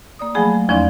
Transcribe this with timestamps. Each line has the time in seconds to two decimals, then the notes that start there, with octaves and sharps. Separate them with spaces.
0.19 A#3 D5 D#6
0.35 F3 F#3 A3 G#4 G#5 B5
0.69 E2 F3 C#4 D#4 D5 C6